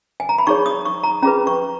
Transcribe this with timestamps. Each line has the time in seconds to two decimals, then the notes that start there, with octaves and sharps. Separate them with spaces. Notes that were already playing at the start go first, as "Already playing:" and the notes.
0.20 G#5
0.29 A#5
0.38 B5
0.47 D#4 G#4 C#5 C#6
0.66 D#6
0.85 C#6
1.03 A#5
1.22 C#4 F4 G#4 B4 A#5
1.47 C#6